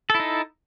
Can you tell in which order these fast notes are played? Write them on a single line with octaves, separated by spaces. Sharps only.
A4 E4 D#4